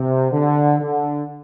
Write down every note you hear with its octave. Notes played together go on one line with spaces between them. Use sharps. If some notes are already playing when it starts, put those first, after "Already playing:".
Already playing: C3
D3
D3